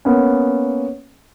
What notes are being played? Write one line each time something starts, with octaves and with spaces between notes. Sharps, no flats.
A#3 B3 C#4